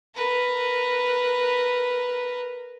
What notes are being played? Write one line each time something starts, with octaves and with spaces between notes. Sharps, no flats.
A#4 B4